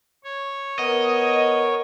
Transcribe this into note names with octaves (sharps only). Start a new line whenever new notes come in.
C#5
B3 A#4 D#5